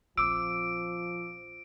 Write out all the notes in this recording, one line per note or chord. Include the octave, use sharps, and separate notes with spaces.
A#1 F3 C4 D6 E6 D7